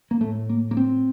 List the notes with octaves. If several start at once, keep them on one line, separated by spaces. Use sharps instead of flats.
A#3
A2 A3
A#3
A#3
C4